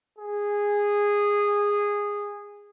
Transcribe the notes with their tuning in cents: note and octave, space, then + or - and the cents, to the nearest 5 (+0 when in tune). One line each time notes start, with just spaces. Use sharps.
G#4 -15